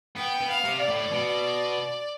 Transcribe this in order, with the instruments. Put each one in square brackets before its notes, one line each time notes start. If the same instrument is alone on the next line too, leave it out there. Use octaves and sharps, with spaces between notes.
[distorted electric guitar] B3 [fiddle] G5
[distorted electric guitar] B3
[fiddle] F5
[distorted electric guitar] C3
[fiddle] D5
[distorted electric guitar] A2
B2